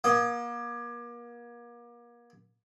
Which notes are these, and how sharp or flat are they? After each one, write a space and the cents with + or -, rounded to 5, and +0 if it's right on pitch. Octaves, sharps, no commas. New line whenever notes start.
A#3 +35 D#6 +0